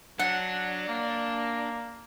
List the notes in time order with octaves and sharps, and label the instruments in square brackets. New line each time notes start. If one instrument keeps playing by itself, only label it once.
[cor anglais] F#3 [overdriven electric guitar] D4 [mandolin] F#5
[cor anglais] A#3